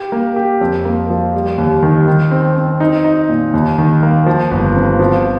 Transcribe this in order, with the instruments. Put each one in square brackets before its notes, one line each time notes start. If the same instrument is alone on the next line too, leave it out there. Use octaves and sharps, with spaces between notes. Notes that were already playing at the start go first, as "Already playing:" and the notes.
Already playing: [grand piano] G4
A#3
G4
F2
A#3
F3
G3
D#2
D#3
D#3
C4
C4
D#4
D#4
A#2
D#2
D#3
A#3
F3
G1
C4
F3